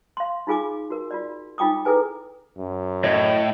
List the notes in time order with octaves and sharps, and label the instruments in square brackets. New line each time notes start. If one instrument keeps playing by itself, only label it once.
[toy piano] F5 C6
D#4 F4 G#4 G#5 D6
F#4 A#4
F4 F#4 D5
D#4 F4 G5 D6 D#6
E4 G#4 A4 B4 G#5
[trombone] F#2
[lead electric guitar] A2 [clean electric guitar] C#5 D#5